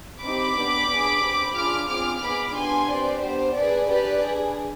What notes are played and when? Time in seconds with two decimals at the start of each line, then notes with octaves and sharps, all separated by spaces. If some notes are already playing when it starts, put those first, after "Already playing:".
0.24 C4 D#4 G4 B5 D6
0.56 B3 D4 G4
0.90 D4 G#4
1.23 C4 G4
1.56 D4 F4 G#4 D6 F6
1.89 C4 F4 G#4 D6 F6
2.23 B3 D#4 G#4 B5 D6
2.56 B3 D4 G4 G#5 C6
2.89 C4 G4 B4 D5
3.22 B3 D4 G4 C5
3.56 D4 G#4 B4 D5
3.89 D4 G4 B4 D5
4.22 D4 G#4